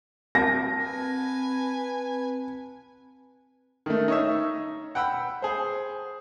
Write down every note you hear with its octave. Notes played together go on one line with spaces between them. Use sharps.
C4 A5 A#6
B4 G#5
D#3 A3
D#4 C#5 E5
F#5 G5 B5 E6
G#4 C5